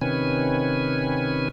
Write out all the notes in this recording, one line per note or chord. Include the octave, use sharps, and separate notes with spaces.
C3 D#3 C#4 B4 G#5